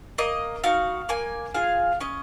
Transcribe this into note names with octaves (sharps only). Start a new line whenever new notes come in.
A#3 D#5
D#4 F#4 F5
A#3 G#5
F4 G#4 F5
C#4 D#5